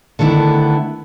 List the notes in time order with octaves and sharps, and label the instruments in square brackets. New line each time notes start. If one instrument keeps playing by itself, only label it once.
[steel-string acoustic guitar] D3 D#3 A3 B3 E4